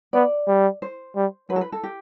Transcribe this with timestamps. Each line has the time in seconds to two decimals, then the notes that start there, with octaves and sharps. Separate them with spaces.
0.13 B3 D5
0.47 G3
0.82 C5
1.16 G3
1.50 F#3 B4
1.56 A4
1.61 B4
1.72 A4
1.83 G4